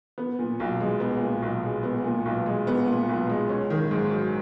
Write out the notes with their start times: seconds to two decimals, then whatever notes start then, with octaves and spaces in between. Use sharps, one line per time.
0.18 B3
0.39 A#2
0.60 B1
0.80 G#3
1.00 B3
1.21 A#2
1.42 B1
1.63 G#3
1.83 B3
2.04 A#2
2.25 B1
2.46 G#3
2.67 B3
2.88 A#2
3.08 B1
3.29 G#3
3.49 C#4
3.70 D#3
3.91 G#2
4.11 F#3